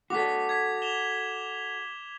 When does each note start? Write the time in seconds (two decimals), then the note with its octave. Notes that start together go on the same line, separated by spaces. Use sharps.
0.10 F#4 A4 D6 B6
0.49 G#6 B6
0.82 E7 F7 G7